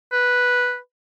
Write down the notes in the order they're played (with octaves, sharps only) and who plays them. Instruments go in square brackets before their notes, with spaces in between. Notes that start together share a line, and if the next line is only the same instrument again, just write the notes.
[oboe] B4